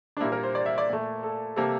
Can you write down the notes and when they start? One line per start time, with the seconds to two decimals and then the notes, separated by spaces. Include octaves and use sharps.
0.17 D4
0.20 A#2 G3 A#3 E4
0.32 A#4
0.43 C5
0.55 D5
0.66 E5
0.78 D5
0.89 A#2 A3
1.23 A4
1.56 C3 G3 A#3 A4